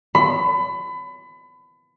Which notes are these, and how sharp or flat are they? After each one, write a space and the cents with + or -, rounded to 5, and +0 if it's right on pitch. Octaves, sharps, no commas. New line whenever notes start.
B5 +30